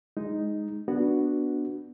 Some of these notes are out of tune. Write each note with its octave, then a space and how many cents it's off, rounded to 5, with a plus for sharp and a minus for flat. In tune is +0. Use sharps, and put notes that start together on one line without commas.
G#3 +0 D#4 +0
B3 -10 D4 +0 F#4 +0